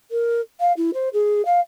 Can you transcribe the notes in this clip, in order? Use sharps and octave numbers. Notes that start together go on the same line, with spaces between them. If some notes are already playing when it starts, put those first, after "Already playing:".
A#4
F5
E4
C5
G#4
F5